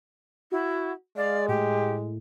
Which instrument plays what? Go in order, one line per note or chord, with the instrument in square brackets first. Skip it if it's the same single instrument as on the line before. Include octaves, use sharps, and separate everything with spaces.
[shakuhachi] E4 [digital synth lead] F#4
[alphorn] G#3 [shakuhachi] D5 [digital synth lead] F5
[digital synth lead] A2 [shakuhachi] G4